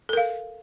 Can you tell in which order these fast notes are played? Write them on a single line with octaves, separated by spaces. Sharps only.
A4 A#4 F5